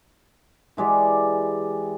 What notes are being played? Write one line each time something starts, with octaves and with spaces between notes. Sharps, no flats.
E3 G#3 G4 D5